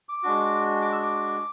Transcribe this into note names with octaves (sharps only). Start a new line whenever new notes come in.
D6
G#3 D4 F#4
D6
E6
D6